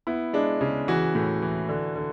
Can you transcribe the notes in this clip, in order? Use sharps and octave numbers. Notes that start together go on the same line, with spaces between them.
B3 E4
G#3 D4
C#3
E3 F#4
A2
E3
D3
D3